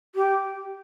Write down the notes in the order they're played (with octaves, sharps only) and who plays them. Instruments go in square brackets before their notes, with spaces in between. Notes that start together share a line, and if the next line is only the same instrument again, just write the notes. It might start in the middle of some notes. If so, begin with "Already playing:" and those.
[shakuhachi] G4